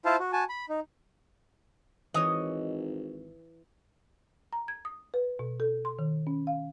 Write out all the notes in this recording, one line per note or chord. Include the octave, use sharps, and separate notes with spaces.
E4 F4 C5 F5 A5
F#4
F#4 G#5 A5
B5
D#4
G#1 E3 C#5 D#5
A#5
G#6
D#6
B4
B2
A4
C6
D#3
C#4
F5